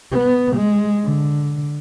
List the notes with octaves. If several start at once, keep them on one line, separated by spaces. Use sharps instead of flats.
B3
G#3
D3